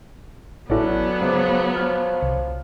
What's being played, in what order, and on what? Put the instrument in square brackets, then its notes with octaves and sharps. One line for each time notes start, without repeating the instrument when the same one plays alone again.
[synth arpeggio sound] A1 E4 [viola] F#3 B3 [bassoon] C#4 [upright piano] F#4 A4 D5
[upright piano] C#2 D6 [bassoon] F3
[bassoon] F3 [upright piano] C#5 F6
[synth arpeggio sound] C2